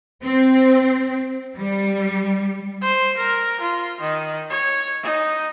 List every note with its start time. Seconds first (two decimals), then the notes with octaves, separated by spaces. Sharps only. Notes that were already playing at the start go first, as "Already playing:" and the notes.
0.23 C4
1.57 G3
2.82 C5
3.17 A#4
3.61 F4
4.01 D#3
4.50 C#5
5.03 D#4